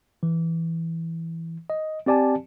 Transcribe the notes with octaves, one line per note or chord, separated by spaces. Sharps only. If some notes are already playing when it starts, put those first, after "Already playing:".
E3
D#5
C4 G4 D5 G#5 A5